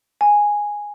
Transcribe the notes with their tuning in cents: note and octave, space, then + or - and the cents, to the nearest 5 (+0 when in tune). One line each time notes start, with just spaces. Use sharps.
G#5 -5